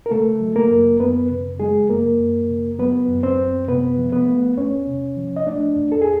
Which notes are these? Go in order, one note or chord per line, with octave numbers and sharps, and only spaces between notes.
A#4
C#3 A3 A4
F#3
A#3 A#4
F#2
F#2 B3 B4
C#3
F#3 G#3 G#4
F#2 A#3 A#4
F#2
C#3
F#3 B3 B4
F#2
C4 C5
F#2
C3 B3 B4
F3
B3 B4
A3
E2 C#4 C#5
C3
F3
D#5
A3 D4 D5
E2
A4
G#4